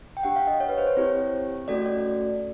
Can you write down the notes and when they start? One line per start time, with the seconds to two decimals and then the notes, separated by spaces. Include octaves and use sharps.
0.17 G5
0.23 D4 G4 F#5
0.36 F5
0.47 D#5
0.60 C#5
0.69 B4
0.78 C5
0.87 C#5
0.97 C4 E4 G4
1.68 A3 C#4 F#4 A4 D5
1.86 D5